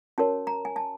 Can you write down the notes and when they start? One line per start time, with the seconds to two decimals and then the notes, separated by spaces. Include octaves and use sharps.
0.18 C#4 F#4 A#4 C#5 A5
0.47 A#5
0.65 G#5
0.76 A5